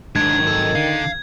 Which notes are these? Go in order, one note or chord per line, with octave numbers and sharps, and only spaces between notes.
G#2 D#3 F#3 D4 G#6
A4
D3 F5